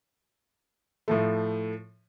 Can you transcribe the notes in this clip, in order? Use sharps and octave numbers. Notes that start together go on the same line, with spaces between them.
A2 F3 A3